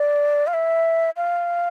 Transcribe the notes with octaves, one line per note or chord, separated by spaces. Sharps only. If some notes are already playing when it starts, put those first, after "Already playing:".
Already playing: D5
F5
E5
F5